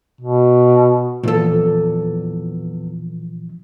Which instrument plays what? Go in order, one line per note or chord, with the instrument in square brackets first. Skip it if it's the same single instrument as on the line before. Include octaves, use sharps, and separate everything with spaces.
[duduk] B2
[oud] E2 A4 [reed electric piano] A#2 E3 F3